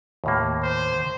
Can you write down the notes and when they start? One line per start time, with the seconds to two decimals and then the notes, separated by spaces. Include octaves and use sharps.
0.24 D#2 A2 A#3
0.63 C5